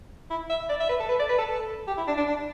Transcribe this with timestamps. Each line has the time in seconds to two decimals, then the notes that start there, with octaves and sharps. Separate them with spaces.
0.30 E4
0.50 E5
0.69 D5
0.80 E5
0.89 B4
1.00 A4
1.09 B4
1.19 D5
1.29 B4
1.39 A4
1.49 A4
1.88 G4
1.97 E4
2.07 D4
2.17 D4
2.28 D4